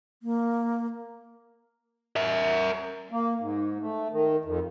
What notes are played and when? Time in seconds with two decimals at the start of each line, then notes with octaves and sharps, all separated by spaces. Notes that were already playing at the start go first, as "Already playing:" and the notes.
0.23 A#3
2.16 A#4 E5
3.11 A#3
3.41 G#2
3.80 A3
4.11 D#3
4.45 F2